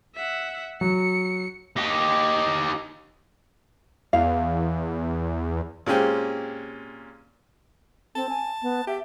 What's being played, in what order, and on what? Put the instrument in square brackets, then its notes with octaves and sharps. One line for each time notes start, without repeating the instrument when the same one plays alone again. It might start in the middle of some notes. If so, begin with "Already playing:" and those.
[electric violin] E5 F#5
[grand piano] F#3 [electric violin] C#7
[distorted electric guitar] D#4 G4
[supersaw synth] E2 [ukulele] F5
[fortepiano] A#2 G#3 C4 C#4 G4
[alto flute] C4 [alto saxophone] A5
[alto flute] G#5
B3
[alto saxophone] G4 [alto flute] E5